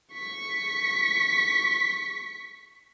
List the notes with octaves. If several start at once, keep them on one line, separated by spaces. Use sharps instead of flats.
C#6 B6